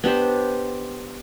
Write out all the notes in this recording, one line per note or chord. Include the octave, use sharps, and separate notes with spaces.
B3 D4 G4 C5